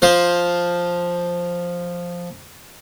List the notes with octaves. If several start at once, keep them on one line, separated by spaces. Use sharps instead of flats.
F3 C5